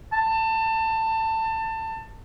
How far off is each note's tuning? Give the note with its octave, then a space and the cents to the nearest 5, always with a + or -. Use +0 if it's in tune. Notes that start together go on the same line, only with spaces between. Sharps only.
A5 +25